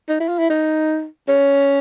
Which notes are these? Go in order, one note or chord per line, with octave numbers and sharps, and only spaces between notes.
D#4
E4
F4
E4
D#4
C#4